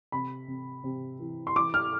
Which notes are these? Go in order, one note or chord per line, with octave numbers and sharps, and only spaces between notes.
C3 B5
C3
C3
E3
C6
E3 D6
F6